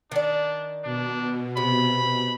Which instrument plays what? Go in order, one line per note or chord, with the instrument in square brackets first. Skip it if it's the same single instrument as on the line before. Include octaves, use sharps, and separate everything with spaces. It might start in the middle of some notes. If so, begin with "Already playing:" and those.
[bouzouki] D#3 D5 [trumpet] D4
[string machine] B2 [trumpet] D4
[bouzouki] C3 [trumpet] B5